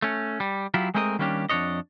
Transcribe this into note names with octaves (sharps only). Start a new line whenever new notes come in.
A3 C#4
G3
F#3 E4 F4 G4
G#3 A3 C4 A#4 C5 D#5
D#3 G3 A#3 C#4 D4 G4
F2 B2 D4 C#5 D#5